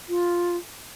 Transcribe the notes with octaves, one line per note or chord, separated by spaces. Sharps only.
F4